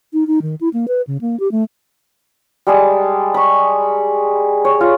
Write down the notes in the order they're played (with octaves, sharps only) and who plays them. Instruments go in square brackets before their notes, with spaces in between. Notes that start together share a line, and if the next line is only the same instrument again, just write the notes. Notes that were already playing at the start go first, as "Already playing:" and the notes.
[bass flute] D#4
D#4
D#3
E4
A#3
B4
C#3
A#3
G4
A3
[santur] G3 G#3 G#4 A5
B5 C#6
C#5
F4